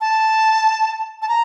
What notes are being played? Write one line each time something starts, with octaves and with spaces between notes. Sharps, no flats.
A5
A5
A#5